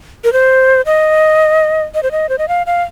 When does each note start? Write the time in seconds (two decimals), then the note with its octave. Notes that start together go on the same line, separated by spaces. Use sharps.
0.24 A#4
0.33 C5
0.86 D#5
1.94 D#5
2.03 C5
2.11 D#5
2.29 C5
2.38 D#5
2.48 F5
2.66 F5